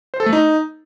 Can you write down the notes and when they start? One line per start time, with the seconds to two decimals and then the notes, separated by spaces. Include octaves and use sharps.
0.14 C5
0.20 A4
0.26 A3
0.33 D#4